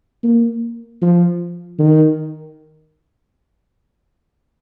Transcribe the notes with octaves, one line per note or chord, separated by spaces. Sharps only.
A#3
F3
D#3